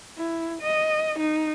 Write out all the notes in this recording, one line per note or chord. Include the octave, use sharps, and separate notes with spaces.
E4
D#5
D#4